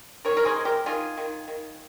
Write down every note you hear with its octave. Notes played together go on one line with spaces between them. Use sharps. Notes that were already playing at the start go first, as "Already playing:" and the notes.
D#3 A#4 C#5
A#4
G#4 C5
G#3
G4 A#4
D#3 F4 G#4
D#3
D#3